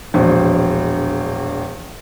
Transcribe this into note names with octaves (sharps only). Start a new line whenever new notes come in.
E1 A#1 C5